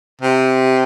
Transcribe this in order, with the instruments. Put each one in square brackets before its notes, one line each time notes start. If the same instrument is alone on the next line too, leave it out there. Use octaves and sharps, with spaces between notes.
[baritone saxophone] C3